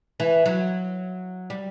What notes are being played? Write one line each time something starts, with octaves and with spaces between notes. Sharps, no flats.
E3
F#3
G3